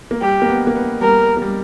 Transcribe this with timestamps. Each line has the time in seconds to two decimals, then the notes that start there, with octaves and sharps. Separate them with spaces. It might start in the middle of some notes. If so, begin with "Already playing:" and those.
0.11 A#3
0.21 G3 G4
0.42 A#3
0.49 B3
0.67 A#3
0.76 B3
1.01 G3 A#4
1.37 A#3
1.42 G3